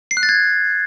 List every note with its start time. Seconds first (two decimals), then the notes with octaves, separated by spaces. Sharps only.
0.11 C7
0.17 F#6
0.23 A6
0.29 G#6